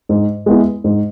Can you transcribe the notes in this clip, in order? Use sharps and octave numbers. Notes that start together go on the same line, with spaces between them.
G#2
G#3 B3 E4
G#2